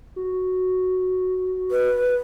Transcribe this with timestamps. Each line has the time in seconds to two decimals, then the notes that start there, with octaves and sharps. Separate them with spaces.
0.16 F#4
1.71 B4